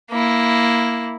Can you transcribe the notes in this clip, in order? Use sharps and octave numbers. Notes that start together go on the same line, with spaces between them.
A#3 E4